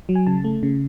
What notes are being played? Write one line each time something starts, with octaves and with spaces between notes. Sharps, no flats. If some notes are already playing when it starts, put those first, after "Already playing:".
F#3
G#5
C#3 A5
A3
C#3